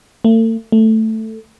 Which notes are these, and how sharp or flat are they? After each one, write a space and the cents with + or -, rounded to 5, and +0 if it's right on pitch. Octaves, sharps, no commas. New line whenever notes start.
A3 +40
A3 +5